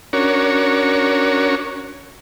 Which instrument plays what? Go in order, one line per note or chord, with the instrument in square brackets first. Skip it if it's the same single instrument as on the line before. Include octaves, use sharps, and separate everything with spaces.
[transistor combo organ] C#4 D4 F#4 A#4 C#5